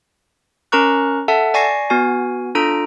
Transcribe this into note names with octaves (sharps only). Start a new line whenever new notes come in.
C#4 A#4 A#5 C#6 F#6
A4 E5 F#5 A5
D5 G#5 C#6 A#6 C7
B3 F#4 G#5
D4 F4 A4 A#5 D7